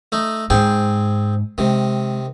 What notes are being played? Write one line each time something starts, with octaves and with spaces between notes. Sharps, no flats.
A3 D#4
G#2 C4 G#4 G5
C3 D#3 G#3